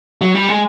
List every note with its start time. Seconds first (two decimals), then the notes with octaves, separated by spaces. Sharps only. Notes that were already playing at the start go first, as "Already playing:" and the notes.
0.21 F#3
0.35 G3
0.48 G#3